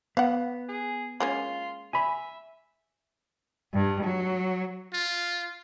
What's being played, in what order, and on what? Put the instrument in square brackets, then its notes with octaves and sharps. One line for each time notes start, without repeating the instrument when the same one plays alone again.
[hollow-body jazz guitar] B3 [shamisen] F5 F#5
[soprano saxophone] G#4
[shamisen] G#3 A#3 C#4 [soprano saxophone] F4
[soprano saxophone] E5 [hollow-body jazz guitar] G#5 B5
[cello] G2
F#3
[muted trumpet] F4